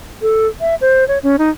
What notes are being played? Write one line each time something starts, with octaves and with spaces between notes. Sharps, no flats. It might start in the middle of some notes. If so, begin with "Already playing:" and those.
A4
E5
C5
C#5
C#4
D#4